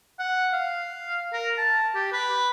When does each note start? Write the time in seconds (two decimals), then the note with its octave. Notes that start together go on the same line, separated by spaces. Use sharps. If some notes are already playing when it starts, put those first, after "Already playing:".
0.19 F#5
0.53 F5
1.33 A#4
1.58 A5
1.95 G4
2.13 B4